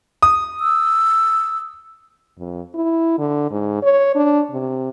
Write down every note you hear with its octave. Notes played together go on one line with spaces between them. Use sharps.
D#6
E6
F2
E4
D3
G#2
C#5
D4
C3